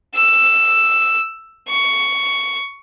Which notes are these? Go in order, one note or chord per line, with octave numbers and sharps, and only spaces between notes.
E6
C#6